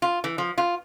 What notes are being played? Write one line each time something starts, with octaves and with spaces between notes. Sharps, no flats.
F4
E3
F3
F4